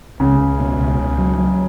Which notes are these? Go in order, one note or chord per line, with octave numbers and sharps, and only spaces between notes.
C#2 C#3
C#2
B2
C#2
C#2
F#3
F#3